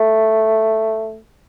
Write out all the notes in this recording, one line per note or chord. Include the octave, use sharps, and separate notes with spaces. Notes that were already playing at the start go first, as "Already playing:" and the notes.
Already playing: A3